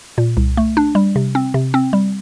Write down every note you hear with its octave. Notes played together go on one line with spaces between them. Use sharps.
A#2
C2
A3
D4
G3
C3
C4
C3
C4
G3